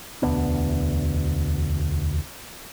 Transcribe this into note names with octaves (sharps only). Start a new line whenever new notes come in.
E1 D2 B3 D4